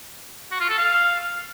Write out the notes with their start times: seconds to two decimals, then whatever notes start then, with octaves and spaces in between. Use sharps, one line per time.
0.51 F#4
0.60 F4
0.69 A4
0.78 F5